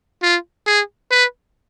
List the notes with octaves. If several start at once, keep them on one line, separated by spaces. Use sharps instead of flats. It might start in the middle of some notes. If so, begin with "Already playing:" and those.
F4
G#4
B4